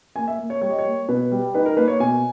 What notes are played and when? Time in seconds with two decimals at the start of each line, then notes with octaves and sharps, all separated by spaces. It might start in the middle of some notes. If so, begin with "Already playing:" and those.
0.16 A#3 G#5
0.28 E5
0.39 A#3
0.50 C#5
0.61 G3 C#5
0.71 D#5
0.79 C#5
0.86 A#3
1.09 B2 B4
1.32 G3
1.55 D#4 B4
1.66 A#4
1.77 A#3 B4
1.88 C#5
2.00 B2 G#5